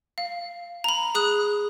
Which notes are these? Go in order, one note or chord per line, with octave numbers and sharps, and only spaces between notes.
F5
A#5 B5
G#4 D#6 F#6